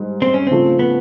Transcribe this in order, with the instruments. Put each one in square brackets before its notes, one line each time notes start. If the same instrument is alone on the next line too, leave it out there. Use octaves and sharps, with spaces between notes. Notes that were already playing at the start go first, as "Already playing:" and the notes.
Already playing: [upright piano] G#2 G3
[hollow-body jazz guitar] C4
C#4
[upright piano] C#3 F3 A3 [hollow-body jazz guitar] C4
[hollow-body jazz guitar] B3